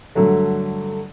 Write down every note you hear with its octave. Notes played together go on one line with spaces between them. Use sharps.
G2 D3 F#3 A3